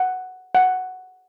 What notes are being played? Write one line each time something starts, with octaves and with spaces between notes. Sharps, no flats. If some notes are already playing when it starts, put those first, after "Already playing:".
Already playing: F#5
F#5